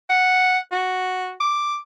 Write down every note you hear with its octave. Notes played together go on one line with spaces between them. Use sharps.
F#5
F#4
D6